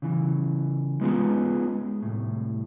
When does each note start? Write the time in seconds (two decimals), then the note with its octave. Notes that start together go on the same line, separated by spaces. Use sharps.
0.02 C#3 E3
1.01 G#3 B3 C#4 D#4 F4 G#4
2.02 C2 A2